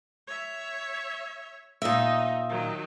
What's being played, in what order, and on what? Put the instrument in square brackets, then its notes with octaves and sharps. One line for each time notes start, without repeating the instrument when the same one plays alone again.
[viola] C#5 E5
[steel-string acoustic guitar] A#2 E5 [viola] D#4 D#5
[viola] D#3 F#3